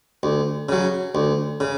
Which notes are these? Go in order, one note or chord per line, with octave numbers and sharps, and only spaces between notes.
D2
C#3 F#3
D2
C#3